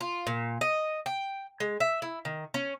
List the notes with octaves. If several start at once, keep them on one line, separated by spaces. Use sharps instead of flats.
F4
A#2
D#5
G5
G#3
E5
E4
D#3
C#4